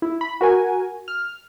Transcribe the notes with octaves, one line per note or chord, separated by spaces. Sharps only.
E4
B5
F#4 A#4 G#5
F6